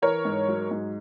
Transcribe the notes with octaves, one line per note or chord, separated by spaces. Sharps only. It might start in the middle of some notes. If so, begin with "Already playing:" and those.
E3 A#4 C#5
G#2
F#3
G#2